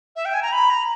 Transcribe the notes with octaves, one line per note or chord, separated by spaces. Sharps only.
E5
G5
G#5
A#5
B5
A#5